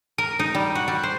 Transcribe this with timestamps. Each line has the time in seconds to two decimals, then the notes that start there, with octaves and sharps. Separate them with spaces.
0.18 A#4
0.39 D#4
0.55 G3
0.75 F#4
0.88 G3
1.03 C5